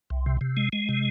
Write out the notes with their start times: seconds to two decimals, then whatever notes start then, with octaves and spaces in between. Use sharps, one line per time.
0.10 C2
0.26 C3
0.41 C3
0.57 G#3
0.73 G#3
0.89 C3